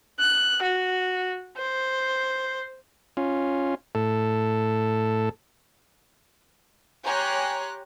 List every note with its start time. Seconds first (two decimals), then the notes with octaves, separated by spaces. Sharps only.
0.19 F#6
0.62 F#4
1.57 C5
3.17 C#4 F4
3.95 A2 A4
7.03 G4 C#5 G#5 A#5 C6 F#6